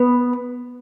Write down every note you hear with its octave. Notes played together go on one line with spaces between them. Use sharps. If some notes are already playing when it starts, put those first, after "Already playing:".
Already playing: B3